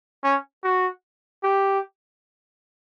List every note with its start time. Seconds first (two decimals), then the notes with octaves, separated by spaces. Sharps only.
0.23 C#4
0.63 F#4
1.43 G4